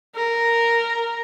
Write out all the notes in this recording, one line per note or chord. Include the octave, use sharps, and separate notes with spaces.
A#4